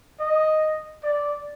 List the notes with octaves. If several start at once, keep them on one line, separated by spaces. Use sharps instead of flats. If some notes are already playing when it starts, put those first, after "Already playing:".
D#5
D5